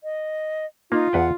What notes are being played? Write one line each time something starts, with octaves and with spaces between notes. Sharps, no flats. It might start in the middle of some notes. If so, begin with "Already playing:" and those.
D#5
A#3 D#4 F4
E2 B4 F#5 G5